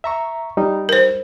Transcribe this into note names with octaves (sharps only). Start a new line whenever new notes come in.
E5 A#5 C#6
G3 D#4
A#4 C5